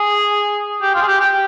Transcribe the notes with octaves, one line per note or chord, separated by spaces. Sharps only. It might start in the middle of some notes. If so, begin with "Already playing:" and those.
Already playing: G#4
G4
F4
G#4
G4
G4